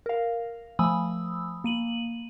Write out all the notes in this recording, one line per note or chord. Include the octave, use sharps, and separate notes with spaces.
A#4 F5
F3 A3 G#5 B5 D#6 E6
A#3 D#7 F#7